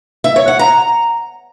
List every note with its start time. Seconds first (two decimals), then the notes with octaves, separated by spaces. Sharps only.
0.24 E5
0.36 C#5
0.48 F#5
0.59 A#5